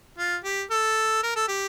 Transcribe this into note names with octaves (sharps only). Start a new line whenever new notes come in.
F4
G4
A4
A#4
A4
G4